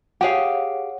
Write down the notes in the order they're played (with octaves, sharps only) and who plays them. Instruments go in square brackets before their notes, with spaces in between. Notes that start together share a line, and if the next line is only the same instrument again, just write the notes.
[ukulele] G4 G#4 F5 [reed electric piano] C#5 F#5